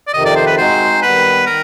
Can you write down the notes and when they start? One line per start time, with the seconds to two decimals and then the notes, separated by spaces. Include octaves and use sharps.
0.07 D5
0.13 F2 C3 D#3 D#5
0.25 D5
0.36 C5
0.47 B4
0.58 G#3 C4 D#4 F#4 C5
1.02 D#3 G3 B3 B4
1.46 D#3 A#4